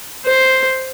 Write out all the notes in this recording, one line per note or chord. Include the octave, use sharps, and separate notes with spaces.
C5